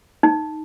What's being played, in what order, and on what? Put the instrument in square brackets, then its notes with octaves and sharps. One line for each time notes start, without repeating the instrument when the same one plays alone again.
[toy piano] D#4